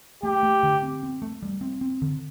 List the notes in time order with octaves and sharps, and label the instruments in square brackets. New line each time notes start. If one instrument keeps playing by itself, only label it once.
[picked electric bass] A3 [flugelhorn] G4
[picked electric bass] A3
D3
C4
C4
A3
G3
C4
C4
D3